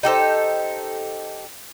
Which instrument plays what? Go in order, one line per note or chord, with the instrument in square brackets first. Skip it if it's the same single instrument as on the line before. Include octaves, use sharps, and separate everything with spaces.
[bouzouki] D#4 G4 A4 C5